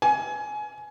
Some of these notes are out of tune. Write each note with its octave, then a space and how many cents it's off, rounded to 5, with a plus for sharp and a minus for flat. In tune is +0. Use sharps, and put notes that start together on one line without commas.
G#5 +20